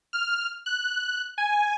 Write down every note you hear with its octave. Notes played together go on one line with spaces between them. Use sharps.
F6
F#6
G#5